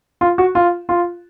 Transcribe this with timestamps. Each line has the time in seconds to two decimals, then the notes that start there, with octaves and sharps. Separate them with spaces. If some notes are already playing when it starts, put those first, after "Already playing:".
0.21 F4
0.38 F#4
0.55 F4
0.89 F4